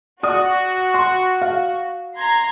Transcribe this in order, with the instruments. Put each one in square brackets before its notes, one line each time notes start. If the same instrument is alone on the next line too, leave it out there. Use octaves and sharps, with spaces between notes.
[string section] F#4 [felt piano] D5 D#6
[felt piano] C6
F5
[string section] A#5 C6 G#6